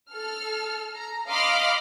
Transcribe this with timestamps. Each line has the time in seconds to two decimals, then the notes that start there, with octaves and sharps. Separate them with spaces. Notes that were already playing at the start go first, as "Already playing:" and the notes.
0.12 A4 F6
0.95 A#5
1.28 D#5 F5 B5 C6 D6 F6